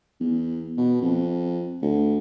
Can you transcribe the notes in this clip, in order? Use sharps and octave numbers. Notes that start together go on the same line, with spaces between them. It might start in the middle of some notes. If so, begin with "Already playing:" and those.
E2
B2
F2
D2